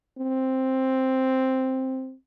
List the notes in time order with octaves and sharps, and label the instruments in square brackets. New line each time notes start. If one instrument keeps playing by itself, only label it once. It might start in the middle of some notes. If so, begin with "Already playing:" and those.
[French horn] C4